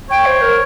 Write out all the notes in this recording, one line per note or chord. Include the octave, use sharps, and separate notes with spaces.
C#5 G5
C5
A#4